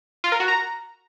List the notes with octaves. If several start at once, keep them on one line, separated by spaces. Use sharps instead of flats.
F4
A#4
F#4
A#5